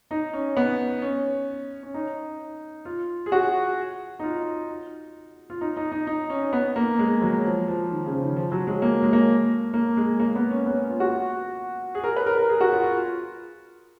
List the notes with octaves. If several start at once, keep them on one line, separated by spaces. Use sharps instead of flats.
D#4
C#4
B3
C#4
C#4
D#4
F4
G#4
F#4
D#4
F4
F4
D#4
D#4
D#4
D#4
C#4
B3
A#3
G#3
F#3
F3
F3
D#3
C#3
F3
D#3
F3
F#3
G#3
A#3
G#3
A#3
A#3
G#3
A#3
B3
C#4
B3
C#4
F4
F#4
G#4
A#4
B4
A#4
A#4
G#4
F#4
F4
F4